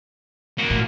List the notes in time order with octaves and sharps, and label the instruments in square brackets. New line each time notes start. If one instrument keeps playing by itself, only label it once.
[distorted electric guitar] A#3 F#4
[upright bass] A2